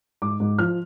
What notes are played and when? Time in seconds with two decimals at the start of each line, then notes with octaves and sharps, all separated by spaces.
0.22 G#2 D6
0.40 G#2
0.58 F3 F6